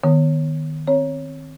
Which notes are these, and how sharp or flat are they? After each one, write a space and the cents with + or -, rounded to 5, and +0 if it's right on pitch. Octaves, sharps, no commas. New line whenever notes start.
D#3 -15 B3 +0
C4 +0 C#5 +0